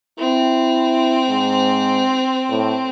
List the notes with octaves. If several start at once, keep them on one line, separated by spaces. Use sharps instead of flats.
C4 E4
G#2
A2